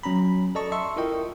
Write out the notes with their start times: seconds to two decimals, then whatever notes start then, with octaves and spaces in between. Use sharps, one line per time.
0.03 F#3 C#4 A#5 B5
0.55 A4 D5 D#5 A5 C#6
0.72 E5 C6 C#6 E6
0.96 E4 F4 A#4 D#5 G5